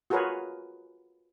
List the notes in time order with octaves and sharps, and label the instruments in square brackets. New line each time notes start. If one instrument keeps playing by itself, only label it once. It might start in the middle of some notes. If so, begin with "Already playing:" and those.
[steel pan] F4 F#4 G#4 A#4 B4 C#5